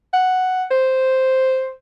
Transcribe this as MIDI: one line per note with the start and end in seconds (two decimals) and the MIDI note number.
0.13 0.65 78
0.71 1.71 72